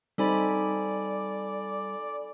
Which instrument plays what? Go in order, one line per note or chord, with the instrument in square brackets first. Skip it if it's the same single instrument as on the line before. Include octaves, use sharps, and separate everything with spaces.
[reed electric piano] G3 [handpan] C4 D#4 C5 [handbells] A4 G#5 B5 [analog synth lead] D5